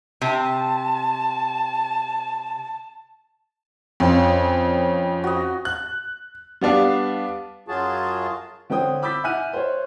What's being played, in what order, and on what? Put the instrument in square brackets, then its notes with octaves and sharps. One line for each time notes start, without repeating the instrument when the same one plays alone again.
[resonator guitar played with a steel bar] C3 [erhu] A5
[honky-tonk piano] F2 [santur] F3 C#4
[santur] F#4 D#5
[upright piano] F#6
G3 B3 D4 F5
[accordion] F#2 F#3 F4 F#4 G#4 A5
[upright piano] D3 C4 C#5 G5 D#6
B5 D6 E6 G6 A6 B6
E5 F#5 G#5 F6 F#6 D#7
C5 C#5